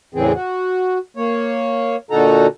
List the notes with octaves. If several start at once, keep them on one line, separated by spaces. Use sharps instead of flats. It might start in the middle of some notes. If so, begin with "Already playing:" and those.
E2 A2 C#3 E3 C4 G#4
F#4
A#3 C#5
A#2 D3 D#4 F#4 A4 A#5